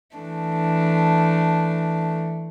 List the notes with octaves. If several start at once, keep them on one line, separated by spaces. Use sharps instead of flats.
E3 A3 D4